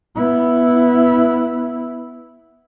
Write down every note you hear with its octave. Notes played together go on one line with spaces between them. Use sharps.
B3 E4